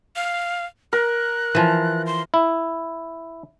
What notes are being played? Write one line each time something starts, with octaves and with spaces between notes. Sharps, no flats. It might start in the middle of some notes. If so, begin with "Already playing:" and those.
F5
A#4 F#6
E3 F3
C6
E4